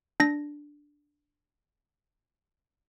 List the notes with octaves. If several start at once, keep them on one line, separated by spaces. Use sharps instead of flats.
D4 A#6